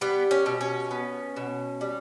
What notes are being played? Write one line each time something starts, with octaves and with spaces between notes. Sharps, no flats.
G3 B3
C#4
B2
C#4
B3
B2
G3